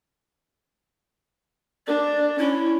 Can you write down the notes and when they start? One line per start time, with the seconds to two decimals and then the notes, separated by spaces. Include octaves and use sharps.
1.87 D4 D5
2.39 C#4 E4